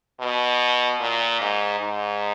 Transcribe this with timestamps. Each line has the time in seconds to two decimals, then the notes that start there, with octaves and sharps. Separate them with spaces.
0.20 B2
1.00 A#2
1.41 G#2
1.80 G#2